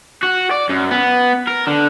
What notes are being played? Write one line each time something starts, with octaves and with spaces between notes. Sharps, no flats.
F#4
D5
F#2
B3
A#4
D3